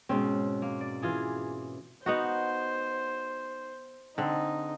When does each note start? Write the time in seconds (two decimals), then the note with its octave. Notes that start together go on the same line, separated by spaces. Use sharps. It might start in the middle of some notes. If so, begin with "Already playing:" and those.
0.09 G#2 B2 C4 C#4
0.62 A#3
0.81 D5
1.02 E3 F4 G#4
2.06 B3 D#4 F#4 C5
4.18 D3 C4 D#4